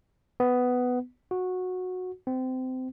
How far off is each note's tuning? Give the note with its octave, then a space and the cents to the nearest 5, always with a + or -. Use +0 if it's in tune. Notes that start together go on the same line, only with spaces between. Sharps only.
B3 +10
F#4 -15
C4 -25